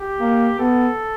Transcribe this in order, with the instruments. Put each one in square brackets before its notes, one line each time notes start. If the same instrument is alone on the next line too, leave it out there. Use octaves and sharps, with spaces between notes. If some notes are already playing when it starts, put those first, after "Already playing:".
Already playing: [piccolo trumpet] G4
[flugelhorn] A#3
[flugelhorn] B3 [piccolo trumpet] A4